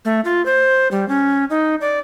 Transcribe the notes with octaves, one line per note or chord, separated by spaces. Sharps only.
A3
F4
C5
G3
C#4
D#4
D5